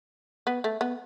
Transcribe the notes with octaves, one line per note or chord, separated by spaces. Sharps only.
B3
A3
B3